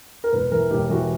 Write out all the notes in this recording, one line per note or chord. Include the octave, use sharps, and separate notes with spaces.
A#4
E1 B4
E3 A#4
E1 G4
E3 F#4